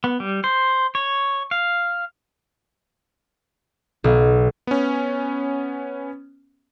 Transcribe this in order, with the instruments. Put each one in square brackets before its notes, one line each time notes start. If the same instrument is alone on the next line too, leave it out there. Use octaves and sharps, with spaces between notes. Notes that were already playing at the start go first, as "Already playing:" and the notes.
[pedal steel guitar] B3
G3
C5
C#5
F5
[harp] B1
[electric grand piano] B3 C#4